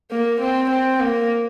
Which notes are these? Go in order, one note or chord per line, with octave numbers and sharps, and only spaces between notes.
A#3
C4
C4
A#3